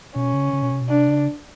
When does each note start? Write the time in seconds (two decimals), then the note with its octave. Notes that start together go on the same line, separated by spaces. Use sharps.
0.15 B2 C#4
0.34 C#3
0.53 C#3
0.63 B2
0.72 C3
0.81 B2
0.90 C3 D4
1.08 C#3